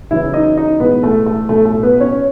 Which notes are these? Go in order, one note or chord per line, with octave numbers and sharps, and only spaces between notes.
E2 C#3 F#3 E4 E5
D#4 D#5
D#4 D#5
B1 A2 E3 G#3 B3 B4
A3 A4
A3 A4
B1 A2 F#3 A3 A4
A3 A4
B3 B4
C#4 C#5